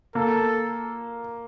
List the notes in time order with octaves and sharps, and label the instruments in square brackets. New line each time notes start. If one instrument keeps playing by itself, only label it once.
[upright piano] A#3 [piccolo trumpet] A4